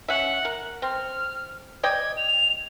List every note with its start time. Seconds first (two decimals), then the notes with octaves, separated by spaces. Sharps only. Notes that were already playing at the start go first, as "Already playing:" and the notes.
0.08 C#4 E5 F#5
0.45 A#4
0.82 C4 F6
1.83 D5 D#5 G5 G#6
2.17 F7